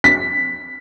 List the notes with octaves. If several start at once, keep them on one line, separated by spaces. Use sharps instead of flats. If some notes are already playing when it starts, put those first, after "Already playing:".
B6